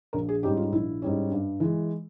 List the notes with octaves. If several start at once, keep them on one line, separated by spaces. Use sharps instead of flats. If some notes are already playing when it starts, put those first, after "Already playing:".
A#1 A#4
G#4
G#2 G3 C#4 G4
F4
A#1 E4
G#2 G3 C#4
G2
E3 G#3